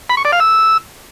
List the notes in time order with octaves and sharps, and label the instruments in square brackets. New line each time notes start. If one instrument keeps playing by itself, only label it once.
[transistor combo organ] B5
C#6
D5
F5
E6